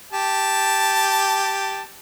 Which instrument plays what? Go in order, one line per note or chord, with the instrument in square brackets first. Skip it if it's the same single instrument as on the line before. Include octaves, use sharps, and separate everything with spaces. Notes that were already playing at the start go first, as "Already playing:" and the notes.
[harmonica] G4 A5